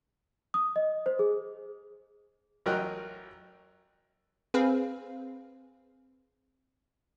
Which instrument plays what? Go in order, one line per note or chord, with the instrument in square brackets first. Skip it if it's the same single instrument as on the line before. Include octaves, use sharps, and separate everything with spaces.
[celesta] D#6
D#5
C5
G#4
[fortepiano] A1 F#3 A#4 D#5 G5 F#6
[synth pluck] C4 G#4 B4 F5